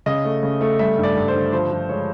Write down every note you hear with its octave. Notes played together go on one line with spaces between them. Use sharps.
C#3 D#5
A3
C#3
A3
G3 E5
G2
D5
G2
C5
D3
F3 C5
F3
G#3 C#5